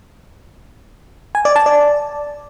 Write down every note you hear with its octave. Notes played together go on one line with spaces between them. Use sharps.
G#5
D5
A5
D5